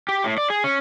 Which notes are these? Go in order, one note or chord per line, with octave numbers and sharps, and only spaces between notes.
G4
A2
D5
G#4
C#4